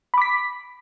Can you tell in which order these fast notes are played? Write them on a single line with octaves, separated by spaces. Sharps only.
B5 D6 B6